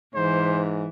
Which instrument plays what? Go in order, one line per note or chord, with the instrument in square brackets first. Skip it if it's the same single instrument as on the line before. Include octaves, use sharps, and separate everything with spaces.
[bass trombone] G#2 [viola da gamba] E3 [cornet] C5